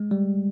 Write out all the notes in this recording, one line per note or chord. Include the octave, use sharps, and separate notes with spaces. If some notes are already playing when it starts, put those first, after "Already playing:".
Already playing: G#3
G3